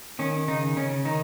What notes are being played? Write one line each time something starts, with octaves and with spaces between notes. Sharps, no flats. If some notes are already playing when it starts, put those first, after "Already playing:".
D#3 C#4
C#3 D#4
C#3 C#4
D#3 D#4